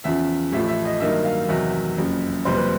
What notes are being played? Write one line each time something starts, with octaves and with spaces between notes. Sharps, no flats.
E2 C#3 F3 E5
A1 A2 F3 A3 E5
E5
D#5
G2 D#3 F#3 A#3 D#4 E5
F5
E2 C3 D#3 F#3 E5
F#1 F2 C#3
F#1 F2 C3 E3 G3 C5
B4